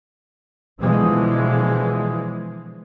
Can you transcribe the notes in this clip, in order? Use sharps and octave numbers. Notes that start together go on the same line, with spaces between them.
B2 D3 E3 F3 G#3